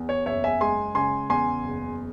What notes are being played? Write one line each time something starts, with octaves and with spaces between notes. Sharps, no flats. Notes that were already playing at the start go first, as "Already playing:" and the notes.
Already playing: E2
C#5
F#1 C#5 E5
E5 G#5
G#3 G#5 C6
C#3 G#5 C6
E2 G#5 C6
F#1